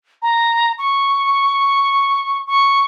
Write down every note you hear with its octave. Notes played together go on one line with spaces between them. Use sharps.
A#5
C#6
C#6